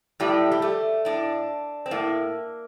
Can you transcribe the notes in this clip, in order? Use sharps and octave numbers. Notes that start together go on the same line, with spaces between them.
A2 G3
G3
A3
A2 D4
C4
A2 A#3